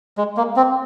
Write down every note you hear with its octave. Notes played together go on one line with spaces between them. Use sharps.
G#3
A#3
C4